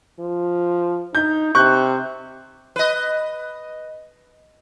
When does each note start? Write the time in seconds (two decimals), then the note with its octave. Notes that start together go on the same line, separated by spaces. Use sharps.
0.20 F3
1.15 D#4 G6
1.55 C3 C#6 F#6 G6
2.76 B4 D#5